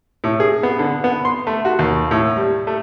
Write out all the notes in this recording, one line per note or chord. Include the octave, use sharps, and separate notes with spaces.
A2
G#4
B3
D3
B3
C6
A3
F#4
D#2
A2
G3
A3